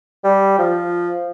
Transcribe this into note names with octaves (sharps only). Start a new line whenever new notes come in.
G3
F3